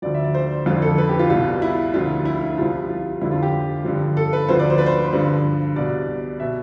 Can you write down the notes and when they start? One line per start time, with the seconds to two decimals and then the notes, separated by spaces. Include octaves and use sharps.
0.02 D2 D3 F3 D5
0.14 E5
0.24 D5
0.35 C5
0.66 F2 D3 F3 F4
0.82 A4
0.98 B4
1.09 G4
1.19 F4
1.30 C2 B2 F4
1.62 E4
1.94 D2 D3 F3 F4
2.25 E4
2.41 E4
2.57 C2 C3 F3 F4
2.89 F4
3.21 F2 D3 F3 E4
3.31 F4
3.43 G4
3.85 G2 D3 F3
4.17 A4
4.33 B4
4.48 D2 D3 F3 C5
4.59 D5
4.70 C5
4.78 B4
4.86 C5
5.13 G2 D3 F3 B4
5.76 C2 B2 D5
6.40 B2 E5